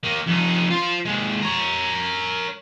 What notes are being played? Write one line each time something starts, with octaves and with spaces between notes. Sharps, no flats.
D#3 A#3
F2 D#4
F4 C5
D#2 G#3
A#4 C#5